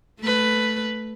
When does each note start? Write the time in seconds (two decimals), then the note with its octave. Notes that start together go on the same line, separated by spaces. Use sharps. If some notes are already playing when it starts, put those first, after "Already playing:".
0.20 A3 B4